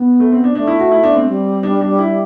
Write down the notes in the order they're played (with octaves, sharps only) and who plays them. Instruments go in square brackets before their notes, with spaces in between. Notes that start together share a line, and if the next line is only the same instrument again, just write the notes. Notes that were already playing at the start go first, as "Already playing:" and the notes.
Already playing: [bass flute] B3
[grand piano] A3
C4
D4
[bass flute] A3 [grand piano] D4
[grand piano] E4
F#4
E4
D4
C4
[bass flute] G3
[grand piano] D4
D4
E4